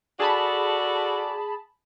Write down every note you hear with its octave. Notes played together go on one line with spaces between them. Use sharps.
F#4 G#4 A4 D5 A5 B5